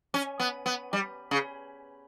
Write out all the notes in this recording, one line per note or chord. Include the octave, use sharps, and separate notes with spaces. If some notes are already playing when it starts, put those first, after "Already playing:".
C#4
B3
B3
G3
C#3